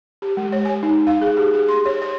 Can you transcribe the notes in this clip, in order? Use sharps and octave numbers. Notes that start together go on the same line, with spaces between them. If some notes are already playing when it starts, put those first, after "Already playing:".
G4
G#3
C#5
G#5
D#4
F5
G#4
G4
G#4
C6
C#5
C#5